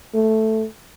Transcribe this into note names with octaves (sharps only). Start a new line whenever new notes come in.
A3